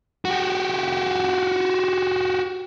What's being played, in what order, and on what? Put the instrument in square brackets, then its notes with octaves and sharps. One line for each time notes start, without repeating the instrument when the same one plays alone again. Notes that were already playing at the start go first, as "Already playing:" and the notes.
[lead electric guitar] F#4 G4